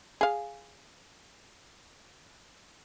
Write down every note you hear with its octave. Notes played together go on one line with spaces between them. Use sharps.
G#4 F5